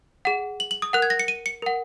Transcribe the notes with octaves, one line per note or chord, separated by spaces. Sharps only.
G#4 F#5
F#7
F#7
D#6
A#4 F#5 F#6
G#6
A#6
C#7
D#7
C#7
A#4 F#5